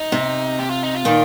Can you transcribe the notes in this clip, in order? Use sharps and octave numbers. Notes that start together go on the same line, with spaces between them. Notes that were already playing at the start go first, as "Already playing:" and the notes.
Already playing: D#4
C3
G4
F4
D#4
F4
A#2 D#3